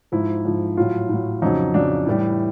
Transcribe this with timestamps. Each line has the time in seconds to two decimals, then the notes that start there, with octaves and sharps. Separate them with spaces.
0.12 G#2 F3 E4
0.45 G#2 F3
0.77 A2 F#3 F4
1.09 A2 F#3
1.42 F2 C#3 F#3 D#4
1.74 F2 C#3 F#3 D4
2.06 A2 E3 G3